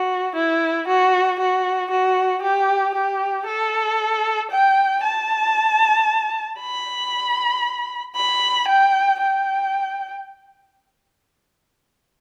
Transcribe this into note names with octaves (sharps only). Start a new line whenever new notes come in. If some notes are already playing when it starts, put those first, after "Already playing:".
Already playing: F#4
E4
F#4
F#4
F#4
G4
G4
A4
G5
A5
B5
B5
G5
G5